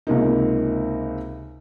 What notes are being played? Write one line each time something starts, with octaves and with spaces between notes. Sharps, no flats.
C#2 C3 A#3 D#4